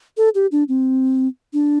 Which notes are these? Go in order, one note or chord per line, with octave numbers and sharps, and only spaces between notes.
A4
G4
D4
C4
D4